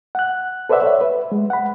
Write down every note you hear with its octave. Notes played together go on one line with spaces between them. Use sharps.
F#5 F#6
A4 B4 C5 D5 E5 F#5
C#5 E5
B4
G#3
F#5 B5